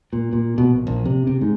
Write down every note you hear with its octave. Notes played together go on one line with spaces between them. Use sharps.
A#2
A#2
B2
A#1
A#1
C3
C3
G#2